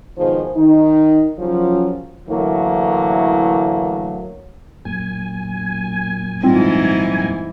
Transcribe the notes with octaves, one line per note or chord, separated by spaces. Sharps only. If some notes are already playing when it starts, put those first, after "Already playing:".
G#2 B2 D#3 F3 G#4 C5
D#3 D#4
F#2 C#3 F3 F#3 C#4 F4
A2 D3 E3 F#3 A3 A#3
F#2 A#2 G#5
G#2 E3 G3 C4 F4